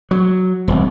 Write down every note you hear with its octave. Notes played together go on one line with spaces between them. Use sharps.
F#3
E1 C2